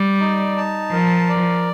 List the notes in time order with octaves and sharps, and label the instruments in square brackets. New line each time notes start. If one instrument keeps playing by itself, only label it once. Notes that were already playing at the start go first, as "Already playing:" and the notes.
Already playing: [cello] G3 [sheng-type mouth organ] D5
[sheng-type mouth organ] D#4
A5
[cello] F3 [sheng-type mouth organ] A#4
[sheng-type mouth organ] D5